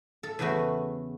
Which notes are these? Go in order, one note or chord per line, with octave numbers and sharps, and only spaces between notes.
A4
E2 C#3 A3 B3 F#4